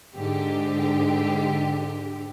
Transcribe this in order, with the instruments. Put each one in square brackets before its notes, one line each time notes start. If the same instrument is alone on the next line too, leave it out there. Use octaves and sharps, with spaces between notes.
[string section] G#2 D3 G4